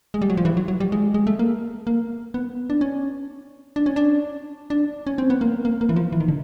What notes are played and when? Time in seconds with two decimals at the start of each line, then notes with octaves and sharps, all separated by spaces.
0.14 G#3
0.22 G3
0.30 F#3
0.37 F3
0.45 E3
0.57 F#3
0.68 F#3
0.80 G3
0.92 G#3
1.14 G#3
1.27 A3
1.39 A#3
1.87 A#3
2.34 B3
2.70 D4
2.81 C#4
3.76 D4
3.86 C#4
3.96 D4
4.70 D4
5.07 C#4
5.18 C4
5.30 B3
5.41 A#3
5.65 A#3
5.81 A#3
5.89 E3
5.96 F3
6.12 E3
6.20 D#3
6.28 D3